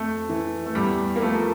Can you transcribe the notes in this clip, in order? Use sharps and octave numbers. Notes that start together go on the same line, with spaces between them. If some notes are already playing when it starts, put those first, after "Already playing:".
Already playing: F2 A3
E3
A3
E2 G3
A#3
F3 A3